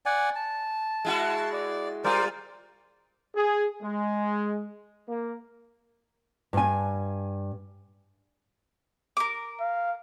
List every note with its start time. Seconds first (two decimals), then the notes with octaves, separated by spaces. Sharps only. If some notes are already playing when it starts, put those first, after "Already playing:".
0.06 D5 F#5 G#5
0.35 A5
1.05 G#3 E4 F#4
1.53 D5
2.04 G3 F4 A#4 C5 D5
3.35 G#4
3.82 G#3
5.08 A#3
6.53 G2 G#5
9.17 A#4 D6
9.60 F5